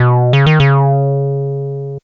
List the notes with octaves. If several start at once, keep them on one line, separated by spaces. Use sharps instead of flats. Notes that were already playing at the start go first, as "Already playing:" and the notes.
Already playing: B2
C#3
D#3
C#3